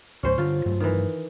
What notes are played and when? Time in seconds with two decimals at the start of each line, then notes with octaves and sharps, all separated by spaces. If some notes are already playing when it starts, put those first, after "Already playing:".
0.23 C#2 G#2 C#4 C5
0.38 G2 D3 F4
0.65 G2 F#3 A3
0.80 D#3 E3